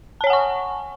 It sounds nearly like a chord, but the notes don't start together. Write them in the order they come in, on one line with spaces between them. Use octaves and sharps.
A5 C#5 G#5 F#5 C#6